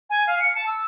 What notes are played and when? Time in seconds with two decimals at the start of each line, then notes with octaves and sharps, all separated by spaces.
0.10 G#5
0.27 F5
0.40 C#7
0.55 A5
0.67 E6